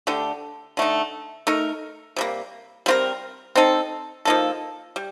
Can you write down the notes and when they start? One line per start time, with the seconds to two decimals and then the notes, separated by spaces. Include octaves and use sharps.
0.07 D3 A3 D4 G4
0.77 D3 A3 D#4
1.47 A3 D#4 A#4
2.16 C3 G3 A#3
2.86 G3 C4 F4 A#4
3.55 C4 D#4 A4
4.25 F3 A#3 D#4 A4
4.96 G3